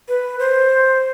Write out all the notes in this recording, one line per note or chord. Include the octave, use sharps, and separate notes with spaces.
B4
C5